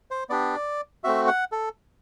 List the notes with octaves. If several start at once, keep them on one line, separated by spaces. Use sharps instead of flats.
C5
B3 D4 G4 D5
A3 C4 F#4 E5
F#5
A4